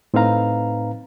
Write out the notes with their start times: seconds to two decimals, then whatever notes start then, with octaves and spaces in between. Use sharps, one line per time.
0.14 A2 C4 D#4 B4 F5 A#5